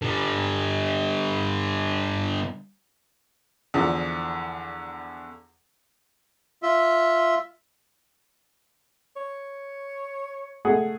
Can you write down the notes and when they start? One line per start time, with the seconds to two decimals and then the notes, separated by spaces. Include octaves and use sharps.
0.02 D3 G3
3.74 E2 D3 F3
6.63 F4 E5
9.16 C#5
10.65 A3 G#4 F#5